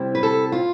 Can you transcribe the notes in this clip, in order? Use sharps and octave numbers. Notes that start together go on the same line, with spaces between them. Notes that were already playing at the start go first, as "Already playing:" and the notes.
Already playing: C3 G3 C4 E4
B4
A4
F4